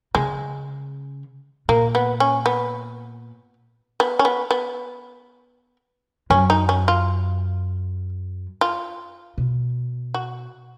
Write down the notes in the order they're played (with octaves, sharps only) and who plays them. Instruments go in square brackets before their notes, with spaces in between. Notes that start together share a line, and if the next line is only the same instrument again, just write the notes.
[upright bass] C#3 [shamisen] G#3
[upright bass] A#2 [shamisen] A#3
[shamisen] B3
C#4
B3
B3
C#4
B3
B3
[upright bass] F#2 [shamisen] C#4
[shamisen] D#4
C#4
F4
F4
[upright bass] B2
[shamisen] F#4